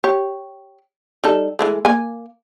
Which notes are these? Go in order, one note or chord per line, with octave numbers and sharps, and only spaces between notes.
G4 C#5
G3 D#4 A4
E3 G#3 A3
A#3 G#5